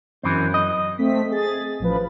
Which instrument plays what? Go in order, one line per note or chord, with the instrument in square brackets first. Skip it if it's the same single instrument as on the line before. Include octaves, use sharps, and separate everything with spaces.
[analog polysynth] F#2 [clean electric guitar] E3 C4
[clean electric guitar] D#5
[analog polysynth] A3 C4 B6
G#4 A6
A1 F3 B4